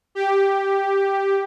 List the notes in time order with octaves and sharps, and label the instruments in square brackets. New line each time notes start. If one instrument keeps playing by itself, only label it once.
[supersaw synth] G4